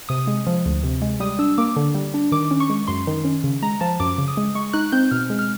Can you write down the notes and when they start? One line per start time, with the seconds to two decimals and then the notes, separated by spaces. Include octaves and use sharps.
0.09 C3 D#6
0.27 G#3
0.47 F3
0.66 D2
0.83 C3
1.02 G#3
1.20 G3 D#6
1.39 D4 E6
1.58 A#3 D6
1.76 D3
1.95 G3
2.14 D4
2.32 D#3 D6
2.51 C#4
2.60 C#6
2.70 G#3
2.88 F#2 C6
3.07 D#3
3.25 C#4
3.44 C#3
3.63 G#3 A#5
3.81 F3 A5
4.00 F#2 D6
4.18 C#3
4.28 D#6
4.37 G#3
4.55 G#3 C#6
4.73 D#4 F#6
4.92 C4 G6
5.11 B2 F6
5.30 G#3
5.39 F6